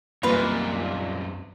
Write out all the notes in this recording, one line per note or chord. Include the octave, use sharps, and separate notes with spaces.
C2 F#2 A#2 E3 D#4 F4 B4 A#5